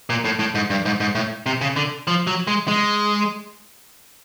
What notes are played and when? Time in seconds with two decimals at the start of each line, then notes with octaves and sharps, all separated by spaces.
0.10 A#2
0.25 A2
0.39 A2
0.55 G#2
0.70 G2
0.85 G#2
1.00 G#2
1.15 A2
1.46 C3
1.61 C#3
1.76 D3
2.07 F3
2.27 F#3
2.47 G#3
2.68 G#3